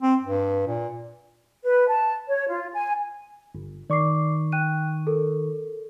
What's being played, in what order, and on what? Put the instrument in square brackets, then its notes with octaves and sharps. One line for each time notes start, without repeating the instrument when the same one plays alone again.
[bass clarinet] C4
G2
A#2
[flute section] B4
A5
C#5
F4
G#5
[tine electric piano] G1
[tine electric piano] D#3 C#6 [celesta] D5 D6 C7
[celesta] G5 F#6 D#7
A4 A#4